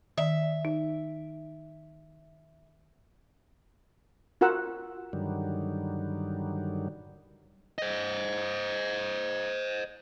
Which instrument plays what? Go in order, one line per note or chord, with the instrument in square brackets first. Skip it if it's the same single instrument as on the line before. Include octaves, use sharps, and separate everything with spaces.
[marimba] D#3 D5 [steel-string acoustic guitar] E5
[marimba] D#4
[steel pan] F4 F#4 A#4 F#5 E6
[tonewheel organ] G2 D3 D#3 F#3 G3
[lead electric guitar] C5 D#5